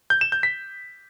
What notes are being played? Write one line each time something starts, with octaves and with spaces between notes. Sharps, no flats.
G6
E7
G6
B6